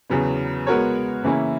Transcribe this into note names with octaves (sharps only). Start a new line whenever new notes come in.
E2 C#3 F#3 B3
G#3 B3 F#4 A#4 C#5
C#3 E3 A#3 C#4 E4